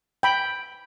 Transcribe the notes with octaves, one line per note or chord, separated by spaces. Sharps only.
G5 B5